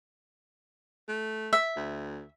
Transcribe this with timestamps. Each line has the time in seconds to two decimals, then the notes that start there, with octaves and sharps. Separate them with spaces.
1.09 A3
1.53 E5
1.77 D2